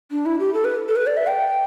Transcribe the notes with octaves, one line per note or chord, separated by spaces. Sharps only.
D4
E4
G4
A4
B4
A4
B4
D5
E5
G5